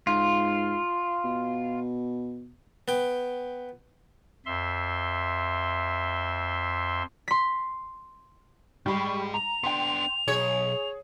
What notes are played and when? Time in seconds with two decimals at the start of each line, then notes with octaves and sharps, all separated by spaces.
0.07 G#2 F4
1.24 B2
2.88 B3 G5
4.46 F2 E5 C6
7.28 C6 B6
8.86 G#2 G3 G#3 B5 C#6
9.34 A#5 F7
9.64 B3 D4 G5 C6
10.28 B1 G#4 C#5